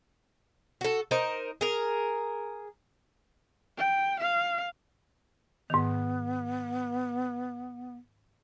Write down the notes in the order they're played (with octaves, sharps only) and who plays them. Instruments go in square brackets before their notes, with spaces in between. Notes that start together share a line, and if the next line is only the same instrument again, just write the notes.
[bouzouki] F#4 A4
D#4 A#4 C5
G#4 A#4
[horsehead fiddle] G5
F5
[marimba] G#2 D#3 [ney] B3